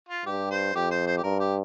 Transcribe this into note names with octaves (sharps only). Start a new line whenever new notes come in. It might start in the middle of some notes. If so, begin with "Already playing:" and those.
F4
G2 G4
C5
F2 G4
C5
C5
G4
G2 A#4
G4